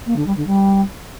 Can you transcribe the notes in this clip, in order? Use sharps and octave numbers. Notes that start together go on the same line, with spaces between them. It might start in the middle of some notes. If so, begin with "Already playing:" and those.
A#3
D3
G3
D3
G3